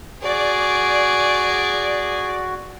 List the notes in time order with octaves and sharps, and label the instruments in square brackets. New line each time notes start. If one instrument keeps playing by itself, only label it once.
[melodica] F#4 [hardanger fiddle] G#4 [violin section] D5